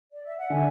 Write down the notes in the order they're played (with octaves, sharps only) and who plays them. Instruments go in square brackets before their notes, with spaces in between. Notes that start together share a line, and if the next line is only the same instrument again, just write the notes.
[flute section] D5
E5
F#5
[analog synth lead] D3 [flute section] E5 G#5